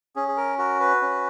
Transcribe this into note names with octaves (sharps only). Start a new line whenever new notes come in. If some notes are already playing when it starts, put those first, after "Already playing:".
C#4 G#4
G#4
A#4
F#4 A#4
B4
C#4